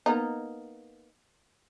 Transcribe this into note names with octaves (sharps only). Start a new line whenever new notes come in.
A#3 B3 D#4